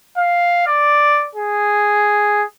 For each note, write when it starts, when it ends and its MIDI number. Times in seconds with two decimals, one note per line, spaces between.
0.17 0.64 77
0.67 1.28 74
1.35 2.45 68